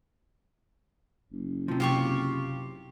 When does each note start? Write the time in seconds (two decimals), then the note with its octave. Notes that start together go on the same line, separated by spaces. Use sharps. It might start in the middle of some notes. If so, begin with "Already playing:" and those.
1.32 F#1
1.68 C3 F3
1.80 C3 F4 G4 C#6